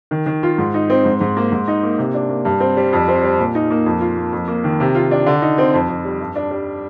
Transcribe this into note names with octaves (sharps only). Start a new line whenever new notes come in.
D#3
D#3
F4
G#2
D#4
C4
G#2
G#2
A#3
G#2
D#4
A#3
C3
D4
A#3
G2
C4
G3
F2
C4
G3
A#2
D#4
A#3
F2
F4
A#3
F2
A#3
D#3
C3
F4
D4
D3
D#4
C4
F2
F2
G3
G2
D4
G3